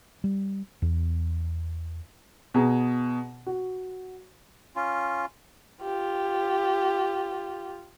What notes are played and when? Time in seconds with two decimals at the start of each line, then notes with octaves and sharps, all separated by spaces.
0.24 G3
0.82 E2
2.54 B2 G#4 A#5
3.47 F#4
4.76 C#4 F4
5.82 F4 G4